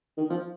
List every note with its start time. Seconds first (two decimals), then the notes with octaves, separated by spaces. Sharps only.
0.18 D#3
0.30 F3